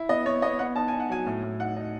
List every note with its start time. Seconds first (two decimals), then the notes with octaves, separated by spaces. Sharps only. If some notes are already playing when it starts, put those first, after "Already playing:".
Already playing: E4
0.09 B3 D#5
0.26 B3 C#5
0.42 B3 D#5
0.59 B3 F#5
0.76 D#4 A5
0.88 D#4 G#5
1.00 F#5
1.09 F#3 G#5
1.27 A2
1.43 A2
1.60 D#4 F#5
1.76 D#4